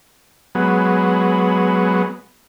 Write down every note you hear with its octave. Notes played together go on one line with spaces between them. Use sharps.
F#3 G#3 B3